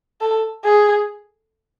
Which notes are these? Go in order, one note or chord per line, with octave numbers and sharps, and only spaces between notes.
A4
G#4